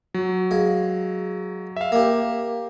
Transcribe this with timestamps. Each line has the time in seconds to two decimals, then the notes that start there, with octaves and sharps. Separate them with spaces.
0.14 F#3
0.51 G#3 F5
1.76 E5 F5
1.92 A#3 G4